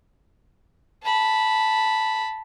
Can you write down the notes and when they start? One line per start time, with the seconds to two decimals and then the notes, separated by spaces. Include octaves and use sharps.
1.03 A5 B5